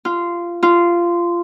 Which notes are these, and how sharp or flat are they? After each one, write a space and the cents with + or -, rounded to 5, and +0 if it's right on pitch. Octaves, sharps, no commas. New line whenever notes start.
F4 -15
F4 -15